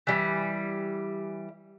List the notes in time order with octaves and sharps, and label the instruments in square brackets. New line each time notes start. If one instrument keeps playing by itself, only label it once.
[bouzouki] E3 G3